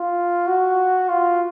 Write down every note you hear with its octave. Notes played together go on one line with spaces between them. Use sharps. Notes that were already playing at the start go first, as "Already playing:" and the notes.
Already playing: F4
F#4
F4